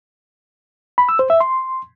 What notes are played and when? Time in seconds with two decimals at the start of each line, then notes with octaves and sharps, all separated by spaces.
0.98 B5
1.09 E6
1.19 C5
1.30 E5
1.41 C6